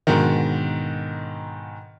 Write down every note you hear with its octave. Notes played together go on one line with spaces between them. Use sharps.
G#2 B2 D3 D#3